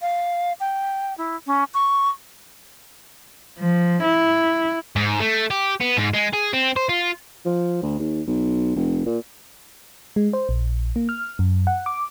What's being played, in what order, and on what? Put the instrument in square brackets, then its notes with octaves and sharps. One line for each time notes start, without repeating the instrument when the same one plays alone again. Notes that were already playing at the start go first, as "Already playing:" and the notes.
[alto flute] F5
G5
E4
C#4
C#6
[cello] F3
E4
[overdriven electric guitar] G#2
A3
G4
B3
G#2
G#3
G#4
C4
C5
F4
[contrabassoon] F3
D2
D#2
B1
F1
A#2
[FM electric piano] G#3
C5
A#1
A#3
F6
F#2
F#5
D6